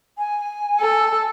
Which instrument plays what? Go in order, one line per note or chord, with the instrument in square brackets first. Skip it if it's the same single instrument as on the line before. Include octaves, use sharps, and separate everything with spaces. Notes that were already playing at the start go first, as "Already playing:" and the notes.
[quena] G#5
[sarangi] A4